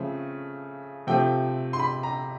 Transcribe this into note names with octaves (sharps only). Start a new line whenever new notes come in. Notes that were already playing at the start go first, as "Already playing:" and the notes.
Already playing: C#3 F3 A3 C4
C3 F3 A3 C4 G5
C6
B5
A#5